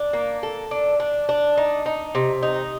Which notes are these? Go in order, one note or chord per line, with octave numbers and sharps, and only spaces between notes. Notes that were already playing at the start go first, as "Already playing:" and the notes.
Already playing: D4
A#3
A4
D4
D4
D4
D#4
D#4
C3
D#4